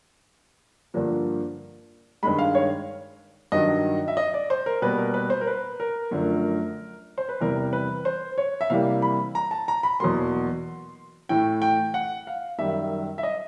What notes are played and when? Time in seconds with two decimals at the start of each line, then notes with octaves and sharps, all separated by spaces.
0.94 G2 D3 F3 A#3
2.23 G2 D#3 G#3 B5
2.39 F5
2.55 C#5
3.52 G2 D#3 F#3 D#5
4.08 E5
4.17 D#5
4.34 D5
4.50 C5
4.66 A#4
4.82 B2 G3 A#3 B4
4.98 A#4
5.14 B4
5.30 C5
5.41 A#4
5.47 B4
5.80 A#4
6.11 F#2 D3 F3 A3
7.18 C5
7.29 B4
7.41 E2 C3 E3 G3 A#4
7.73 B4
8.05 C5
8.38 C#5
8.61 E5
8.70 C3 E3 G3 A#3 F5
9.02 B5
9.35 A#5
9.51 A5
9.68 A#5
9.83 B5
10.00 E2 B2 F#3 A#3 C6
11.29 A2 E3 A3 G5
11.62 G5
11.94 F#5
12.27 F5
12.58 F#2 D#3 G3 E5
13.18 E5
13.23 D#5